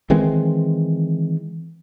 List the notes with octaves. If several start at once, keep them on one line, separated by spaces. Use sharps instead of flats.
D#3 E3 G#3 C4